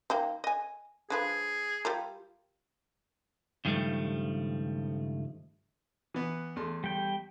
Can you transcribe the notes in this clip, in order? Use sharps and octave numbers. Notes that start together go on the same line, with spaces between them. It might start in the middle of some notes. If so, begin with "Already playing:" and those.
D#3 A#3 G5
D#5 G#5
D3 F3 G#4 B4
G3 F4 A#4
C#2 G2 D#3 F3 G3 A3
E3 B3
E2 A3 C6
G3 G5